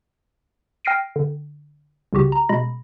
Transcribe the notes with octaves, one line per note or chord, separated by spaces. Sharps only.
G5 F6 A#6 C7 D7 D#7
D3
C2 C#3 F#4 G4
A#5
B2 G#3 B5 A#6